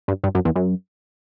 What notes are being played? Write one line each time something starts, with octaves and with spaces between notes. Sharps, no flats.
G2
G2
F#2
E2
F#2